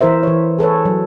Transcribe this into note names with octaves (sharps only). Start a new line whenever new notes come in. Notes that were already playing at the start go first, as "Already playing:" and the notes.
E3 E4 A#4 C5 E5
E3 C#5
G#4 A4 B4 C#5
F#3